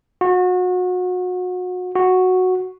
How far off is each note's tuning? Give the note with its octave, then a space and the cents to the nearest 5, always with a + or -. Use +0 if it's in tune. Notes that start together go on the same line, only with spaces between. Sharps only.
F#4 -30
F#4 -5